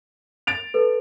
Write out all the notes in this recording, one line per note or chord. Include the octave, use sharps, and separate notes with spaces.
A6 D7 F7
A4 B4